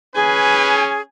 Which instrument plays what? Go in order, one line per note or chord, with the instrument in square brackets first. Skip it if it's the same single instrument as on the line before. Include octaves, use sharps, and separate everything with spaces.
[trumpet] C#4 [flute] G#4 [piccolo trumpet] B4 [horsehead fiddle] G#5